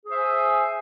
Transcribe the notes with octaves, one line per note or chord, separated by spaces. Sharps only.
G#4 C5 E5 G#5